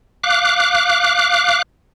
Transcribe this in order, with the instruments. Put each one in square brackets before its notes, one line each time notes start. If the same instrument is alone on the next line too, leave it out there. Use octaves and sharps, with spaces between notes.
[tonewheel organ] F5 D6 F#6